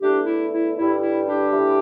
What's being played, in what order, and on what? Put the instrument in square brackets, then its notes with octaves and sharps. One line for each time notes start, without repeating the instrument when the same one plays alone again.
[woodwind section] E2 D3 A3 D4 G4
E4
E4
G2 D3 G3 E4
E4
D4 G4
A2 E3 G3